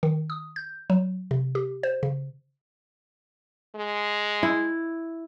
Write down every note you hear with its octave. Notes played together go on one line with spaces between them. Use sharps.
D#3
D#6
G6
F#3
C3
G4
C5
C#3
G#3
E4